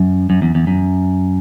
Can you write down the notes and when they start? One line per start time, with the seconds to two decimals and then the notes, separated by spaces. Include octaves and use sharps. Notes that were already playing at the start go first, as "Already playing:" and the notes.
Already playing: F#2
0.30 F#2
0.42 E2
0.55 E2
0.67 F#2